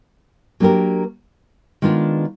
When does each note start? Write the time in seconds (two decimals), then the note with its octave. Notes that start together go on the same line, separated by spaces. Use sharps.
0.60 F#3 A#3 D4 G4 A#4
1.82 D#3 G#3 B3 D4 F4